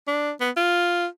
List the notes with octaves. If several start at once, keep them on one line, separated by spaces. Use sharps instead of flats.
D4
B3
F4